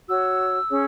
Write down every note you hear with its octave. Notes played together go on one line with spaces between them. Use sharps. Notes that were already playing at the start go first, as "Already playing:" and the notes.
F#4 C#5 E6
C#4 G#4 C#5